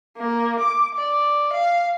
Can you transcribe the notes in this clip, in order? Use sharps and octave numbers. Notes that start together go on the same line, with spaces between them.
A#3
D6
D5
F5